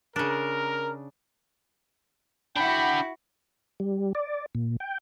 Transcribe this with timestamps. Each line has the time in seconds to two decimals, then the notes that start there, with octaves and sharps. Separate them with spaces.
0.16 C#3 D4 A#4
2.56 D4 E4 F#4 F#5 G5 B5
3.80 G3
4.15 D5
4.55 A#2
4.80 G5